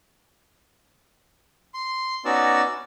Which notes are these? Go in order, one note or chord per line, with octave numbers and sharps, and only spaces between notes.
C6
B3 C#4 D#4 F#4 D5 E6